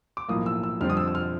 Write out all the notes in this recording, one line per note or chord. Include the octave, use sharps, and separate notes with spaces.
D6
B1 A2 F3 A#3 D#6
E6
E6
F2 D3 G3 C4 F6
D#6
E6
E6
F6